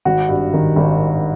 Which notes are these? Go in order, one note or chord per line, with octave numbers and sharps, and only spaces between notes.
G#1 F#4
G2
D#3
G#1